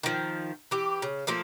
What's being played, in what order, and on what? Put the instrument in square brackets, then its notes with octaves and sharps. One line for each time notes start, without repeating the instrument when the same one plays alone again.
[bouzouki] D#3 F3
E3 G4
C#3
F3 A3 A#3